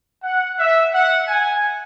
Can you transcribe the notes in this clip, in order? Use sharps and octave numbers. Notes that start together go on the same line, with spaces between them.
F#5
E5
F#5
G#5